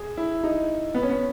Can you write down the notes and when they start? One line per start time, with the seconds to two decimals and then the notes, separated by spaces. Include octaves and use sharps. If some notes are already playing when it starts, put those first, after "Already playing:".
Already playing: G#4
0.17 E4
0.43 D#4
0.95 B3
1.03 C#4
1.10 B3